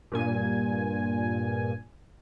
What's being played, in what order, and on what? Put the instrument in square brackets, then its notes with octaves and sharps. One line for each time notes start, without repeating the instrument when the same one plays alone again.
[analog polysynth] G2 A#2 G#5